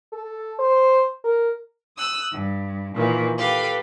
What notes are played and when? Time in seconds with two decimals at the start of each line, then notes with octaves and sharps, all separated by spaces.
0.13 A4
0.59 C5
1.24 A#4
1.97 D#6 E6 F#6
2.30 G2
2.94 A#2 D#3 E3
3.37 G4 A4 B4 F5 G5